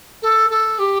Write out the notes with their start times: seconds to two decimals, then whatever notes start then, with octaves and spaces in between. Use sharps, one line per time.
0.22 A4
0.50 A4
0.79 G4